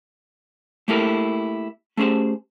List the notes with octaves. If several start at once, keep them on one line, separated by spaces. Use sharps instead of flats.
A3 A#3 E4 G4 A4 A#4
A3 C#4 G4 G#4 C5